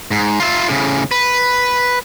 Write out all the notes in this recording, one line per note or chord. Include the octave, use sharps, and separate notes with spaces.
G#2
F4 E5
A2 C#3
B4